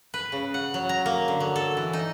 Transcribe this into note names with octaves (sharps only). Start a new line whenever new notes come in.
B4
C#3
F#5
F#3
A#5
A#3
D3
F#3
A4
E3
D#4